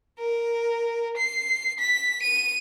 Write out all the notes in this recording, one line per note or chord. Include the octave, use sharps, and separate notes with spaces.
A#4
C7
B6
D#7